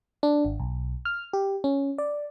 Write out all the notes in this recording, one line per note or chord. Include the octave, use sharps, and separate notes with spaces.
D4
G#1
B1
F6
G4
C#4
D5